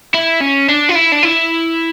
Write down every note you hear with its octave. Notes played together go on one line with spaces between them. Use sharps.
E4
C#4
D4
F4
E4
D4
E4